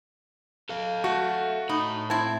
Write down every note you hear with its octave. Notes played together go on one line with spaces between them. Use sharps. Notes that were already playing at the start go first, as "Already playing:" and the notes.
A4 F5
A3 F#4
A2 D#4 B5
C4 E4 A5 G#6